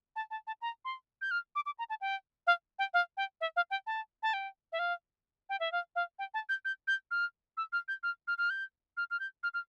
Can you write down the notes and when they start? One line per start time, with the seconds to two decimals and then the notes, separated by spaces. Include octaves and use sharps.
0.16 A5
0.31 A5
0.47 A5
0.62 A#5
0.85 C6
1.21 G6
1.31 F6
1.55 D6
1.66 D6
1.79 A#5
1.90 A5
2.01 G5
2.47 F5
2.79 G5
2.94 F5
3.17 G5
3.41 E5
3.56 F5
3.71 G5
3.87 A5
4.23 A5
4.34 G5
4.72 E5
4.79 F5
5.49 G5
5.60 E5
5.72 F5
5.96 F5
6.19 G5
6.34 A5
6.49 G6
6.65 G6
6.88 G6
7.11 F6
7.57 E6
7.73 F6
7.88 G6
8.03 F6
8.28 F6
8.38 F6
8.50 G6
8.97 F6
9.11 F6
9.20 G6
9.43 F6
9.54 F6